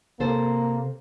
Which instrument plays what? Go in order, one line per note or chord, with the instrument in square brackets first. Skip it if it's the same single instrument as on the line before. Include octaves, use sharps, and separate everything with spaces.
[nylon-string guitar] C3 A4 C5 [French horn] A#3